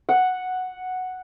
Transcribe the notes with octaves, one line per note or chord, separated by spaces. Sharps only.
F#5